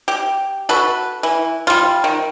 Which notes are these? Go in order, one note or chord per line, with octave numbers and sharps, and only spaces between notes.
G4
F#4 A4 B4
E3
G3 F4
D#3